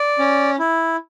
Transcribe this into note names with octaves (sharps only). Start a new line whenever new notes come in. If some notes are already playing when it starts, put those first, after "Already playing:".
Already playing: D5
C#4
E4